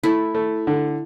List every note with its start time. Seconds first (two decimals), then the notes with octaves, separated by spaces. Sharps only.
0.03 A3 E4
0.35 A3
0.67 D3